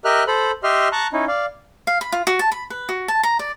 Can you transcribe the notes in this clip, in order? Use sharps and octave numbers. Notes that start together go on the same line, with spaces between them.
G4 A#4 D#5 E5 F6 F#6
A4 C5 B5
G4 D#5 E5 C6 F6
A5 A#5 C#6 F#6
C#4 D#4 E4
D5 F5
F5
B5
F4
F#4
A5
B5
B4
F#4
A5
A#5
D5